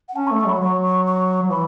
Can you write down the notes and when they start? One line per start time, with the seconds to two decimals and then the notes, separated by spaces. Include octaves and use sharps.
0.09 F#5
0.15 C#4 A5
0.27 C#6
0.31 A3
0.38 C#6
0.46 F#3 B5
0.61 F#3 C#6
0.84 C#6
1.07 C#6
1.43 F#3
1.51 E3 B5